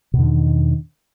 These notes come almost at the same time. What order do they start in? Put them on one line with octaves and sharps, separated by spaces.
B2 E2 D3 D#3